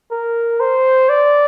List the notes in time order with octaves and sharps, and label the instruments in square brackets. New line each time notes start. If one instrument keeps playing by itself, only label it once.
[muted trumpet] A#4
C5
D5